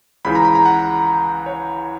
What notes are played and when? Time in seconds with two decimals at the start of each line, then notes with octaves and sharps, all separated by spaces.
0.25 C#2 C#3 E3 B5
0.35 A#5
0.45 B5
0.55 A#5
0.65 F#5
1.46 C#5